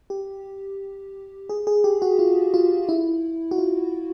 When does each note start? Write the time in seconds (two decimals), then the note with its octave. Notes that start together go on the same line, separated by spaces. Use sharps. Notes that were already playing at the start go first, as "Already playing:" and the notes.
0.10 G4
1.49 G#4
1.67 G#4
1.84 G4
2.02 F#4
2.19 F4
2.54 F4
2.89 E4
3.51 F#4
3.58 F4